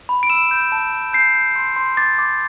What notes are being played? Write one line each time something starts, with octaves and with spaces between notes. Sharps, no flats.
B5
D7
E6 E7
G6
A5
A5
G6 C7
G6
C6
C6
D6 A6
D6